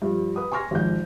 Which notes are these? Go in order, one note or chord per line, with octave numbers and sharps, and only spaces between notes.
G2 F3
B4 D#6
G#5 C6 C#6 F6 A#6
G#1 F2 G6